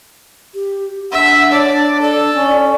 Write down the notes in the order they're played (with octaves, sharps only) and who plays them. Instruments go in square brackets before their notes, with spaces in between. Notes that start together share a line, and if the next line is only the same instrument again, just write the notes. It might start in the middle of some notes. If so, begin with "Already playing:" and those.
[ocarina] G4
[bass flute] D4 [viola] E5 [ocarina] F#5
[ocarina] C#5 [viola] D5
[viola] A4 [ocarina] D5
[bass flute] C#4